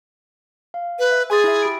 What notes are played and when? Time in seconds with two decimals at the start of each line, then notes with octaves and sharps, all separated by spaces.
0.74 F5
0.99 B4
1.11 E5
1.30 G#4 G#5 C6 A6
1.44 E4 E5
1.62 G4 B5 D7